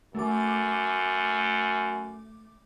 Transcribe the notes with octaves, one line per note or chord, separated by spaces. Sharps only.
F#2 A3 D6